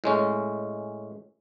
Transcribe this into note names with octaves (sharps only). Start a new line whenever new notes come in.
A2 G#3 C#4